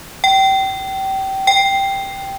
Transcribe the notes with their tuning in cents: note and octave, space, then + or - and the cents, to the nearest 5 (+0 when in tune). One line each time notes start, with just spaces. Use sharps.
G5 -25
G5 +0